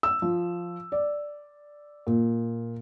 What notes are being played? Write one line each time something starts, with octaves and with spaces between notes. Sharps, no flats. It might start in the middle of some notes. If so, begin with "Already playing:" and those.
E6
F3
D5
A#2